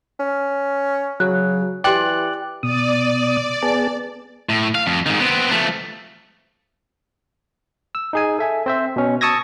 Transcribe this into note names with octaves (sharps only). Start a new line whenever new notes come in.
C#4
C#3 F#3 F#6
E3 G4 D5 G5 F#6
B2 D5 D#6
B3 G#4 A5
A2
F5
F2
G#2 D#3
B3 C4
F3 A3
E6
D#4 G#4 G#5
A4 E5 G#5
C4 C5 E5
B2 C#4
A5 C#6 D#6 E6 G#6 A#6